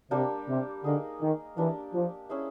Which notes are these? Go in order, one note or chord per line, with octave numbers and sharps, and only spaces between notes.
C3 G3 A#3 D4 G4
C3
D3 A#3 D#4 G#4
D#3
E3 A#3 D4 G4
F3
C#4 E4 G#4 C5